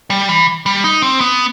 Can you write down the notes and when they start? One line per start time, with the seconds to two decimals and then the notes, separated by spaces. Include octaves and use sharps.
0.10 G3
0.29 E3
0.66 G3
0.84 D#4
1.02 C4
1.21 B3